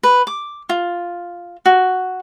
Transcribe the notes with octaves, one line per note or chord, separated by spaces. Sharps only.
B4
D6
F4
F#4